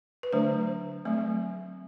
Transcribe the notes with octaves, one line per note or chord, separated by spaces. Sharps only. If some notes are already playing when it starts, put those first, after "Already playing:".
B4
D3 F#3 A3 D4 C5
F#3 A3 C4